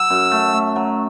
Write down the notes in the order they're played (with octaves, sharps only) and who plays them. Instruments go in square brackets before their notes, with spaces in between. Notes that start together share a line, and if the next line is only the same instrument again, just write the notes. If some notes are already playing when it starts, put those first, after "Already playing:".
Already playing: [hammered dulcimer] F#3 [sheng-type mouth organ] E6
[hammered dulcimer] F#2
A3
A3
F#3